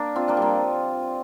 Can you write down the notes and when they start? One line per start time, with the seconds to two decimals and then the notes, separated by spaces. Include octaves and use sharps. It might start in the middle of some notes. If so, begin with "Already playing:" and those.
Already playing: A#3 D4
0.16 C4 F4
0.28 A#3 D4
0.37 G3
0.42 F3 A#3